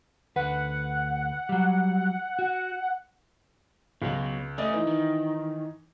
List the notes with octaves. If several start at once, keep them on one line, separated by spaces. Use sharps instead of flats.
D2 B4 F#5
F#3 G3
F#4
C#2 B2 F#3
A3 C#4 D5 D#5 D#6
E3 D#4
D#3